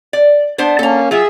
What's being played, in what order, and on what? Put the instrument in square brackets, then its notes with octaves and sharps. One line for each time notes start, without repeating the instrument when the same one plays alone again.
[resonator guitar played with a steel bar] D5
B3 D4 C5
[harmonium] A#3 C#4 [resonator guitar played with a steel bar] A4 A#5
[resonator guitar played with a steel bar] F#3 F4 [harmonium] G#4 E5